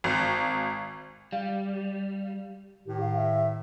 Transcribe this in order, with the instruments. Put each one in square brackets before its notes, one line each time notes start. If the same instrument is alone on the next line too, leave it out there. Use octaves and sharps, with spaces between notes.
[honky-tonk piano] G#1
[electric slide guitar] G3 [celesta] F5
[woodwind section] A2 D#3 [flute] G4
[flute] F5
E5